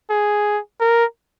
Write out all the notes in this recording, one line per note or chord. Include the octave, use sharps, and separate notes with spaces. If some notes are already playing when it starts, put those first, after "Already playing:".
G#4
A#4